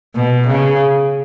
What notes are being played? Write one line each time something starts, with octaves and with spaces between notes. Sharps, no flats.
B2
C#3